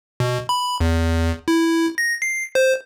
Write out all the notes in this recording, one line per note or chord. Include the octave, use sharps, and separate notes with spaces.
B2
B5
E2
E4
A#6
C7
C5